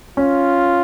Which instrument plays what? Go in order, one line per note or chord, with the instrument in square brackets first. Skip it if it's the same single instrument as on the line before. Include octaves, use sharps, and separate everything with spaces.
[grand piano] C#4 [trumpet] F4